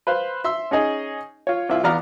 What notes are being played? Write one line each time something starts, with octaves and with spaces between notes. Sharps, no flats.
B4 C5 F5 C6
E5 C6 E6
C#4 D#4 G#4 D#5
F4 C#5
C2 E4 F4
E2 B3 D5 F5 A#5 F6